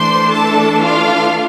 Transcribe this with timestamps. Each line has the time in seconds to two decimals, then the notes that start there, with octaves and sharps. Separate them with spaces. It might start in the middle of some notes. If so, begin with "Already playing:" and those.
Already playing: E3 A3 D4 C5 C6
0.31 A4 A5
0.84 F4 F5